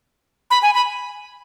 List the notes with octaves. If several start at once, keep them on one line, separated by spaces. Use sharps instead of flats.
B5
G#5
B5